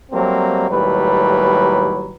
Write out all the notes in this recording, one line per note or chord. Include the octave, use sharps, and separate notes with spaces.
F#3 G3 A3 A#3 C4
D#2 A2 F#3 G3 B4